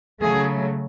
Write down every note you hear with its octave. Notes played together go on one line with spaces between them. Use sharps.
C#3 F#3 A3 G#4